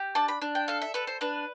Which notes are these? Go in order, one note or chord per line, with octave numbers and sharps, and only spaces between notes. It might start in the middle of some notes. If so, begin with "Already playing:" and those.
Already playing: G4
D4 A5
B5
D4
G5
A4 F5
E5
A4 B4
C5
D4 B4